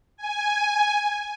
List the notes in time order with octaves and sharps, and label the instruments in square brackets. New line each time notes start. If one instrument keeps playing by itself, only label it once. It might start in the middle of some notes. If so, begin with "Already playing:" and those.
[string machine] G#5